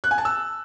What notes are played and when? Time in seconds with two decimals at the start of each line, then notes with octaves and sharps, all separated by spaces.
0.04 F#6
0.11 G#5
0.18 A5
0.25 E6